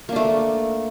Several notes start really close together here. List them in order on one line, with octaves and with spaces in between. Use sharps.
A#3 D4 A3